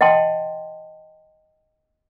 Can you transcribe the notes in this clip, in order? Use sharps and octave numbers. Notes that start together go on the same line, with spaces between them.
D#5 F#5 G5 A5 C6